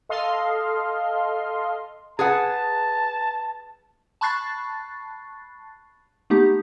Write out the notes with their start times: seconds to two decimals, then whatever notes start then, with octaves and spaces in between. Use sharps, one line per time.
0.09 A4 D#5 F5 C6
2.19 G#4 B4 F#5 A5
4.21 A5 B5 C#6 F#6 A6 C7
6.30 A3 B3 D#4 G4